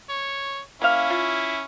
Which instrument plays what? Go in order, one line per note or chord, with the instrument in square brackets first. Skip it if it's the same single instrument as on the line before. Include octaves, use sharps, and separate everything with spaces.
[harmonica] C#5
[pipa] A#3 F5 [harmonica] C#4 E4
[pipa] F4